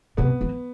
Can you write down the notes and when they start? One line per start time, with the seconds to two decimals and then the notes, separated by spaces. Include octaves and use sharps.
0.17 C3 B3
0.41 E3